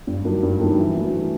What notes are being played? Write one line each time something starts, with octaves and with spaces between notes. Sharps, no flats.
G2
D#3 F#3 A#3 D4
G2
D#3 F#3 A#3 D4
E3
A3 D4 F#4
E3